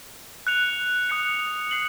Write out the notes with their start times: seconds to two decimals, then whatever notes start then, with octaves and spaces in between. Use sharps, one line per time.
0.47 F#6 C#7 F7
1.10 D#6 F#6 C#7
1.71 F#6 C7 F#7